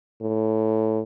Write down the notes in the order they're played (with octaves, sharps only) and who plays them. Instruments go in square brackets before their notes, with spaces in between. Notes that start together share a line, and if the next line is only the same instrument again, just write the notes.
[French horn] A2